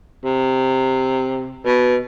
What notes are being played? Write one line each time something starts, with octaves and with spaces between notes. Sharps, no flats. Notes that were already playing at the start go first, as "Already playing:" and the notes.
C3
B2